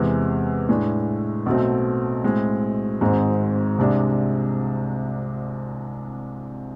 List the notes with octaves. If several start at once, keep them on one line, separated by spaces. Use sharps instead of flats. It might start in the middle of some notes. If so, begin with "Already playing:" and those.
Already playing: E2 C3 G#3
A2 G#3 D4
B1 B2 A3 C4
A2 G#3 C4
G#1 G#2 G#3 C4
C2 C3 G#3 D4